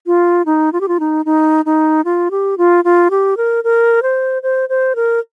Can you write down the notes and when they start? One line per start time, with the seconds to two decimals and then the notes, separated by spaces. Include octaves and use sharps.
0.06 F4
0.46 D#4
0.73 F4
0.81 G4
0.88 F4
1.00 D#4
1.26 D#4
1.66 D#4
2.05 F4
2.31 G4
2.58 F4
2.84 F4
3.11 G4
3.37 A#4
3.64 A#4
4.03 C5
4.43 C5
4.69 C5
4.96 A#4